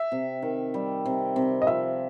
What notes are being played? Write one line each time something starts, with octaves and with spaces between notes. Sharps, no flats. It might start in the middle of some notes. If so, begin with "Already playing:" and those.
Already playing: E5
C3
D#3
G3
C3
C3
D#5
F3 E5